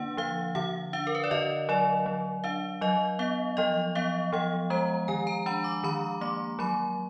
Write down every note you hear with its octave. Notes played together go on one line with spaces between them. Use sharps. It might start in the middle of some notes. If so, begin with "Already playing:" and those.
Already playing: D3 A#3 D4 B4 F#5
F3 F5
D3 F#5
D4 F5
A#4
B4
D5
D3 D#5
F#3 D5
F#3
D4 F5
F#3 D#5
B3 F5
F3 D#5
B3 F5
F3 F#5
G#3 A#5
D#3 G#5
A#5
D4 B5
D6
D#3 B5
A#3 D6
F#3 B5